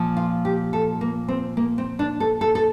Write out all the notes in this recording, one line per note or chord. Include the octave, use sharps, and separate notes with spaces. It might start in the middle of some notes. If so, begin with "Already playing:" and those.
Already playing: A#2 F3
F4
G4
A4
A#3
C4
A#3
C4
D4
A4
A4
A4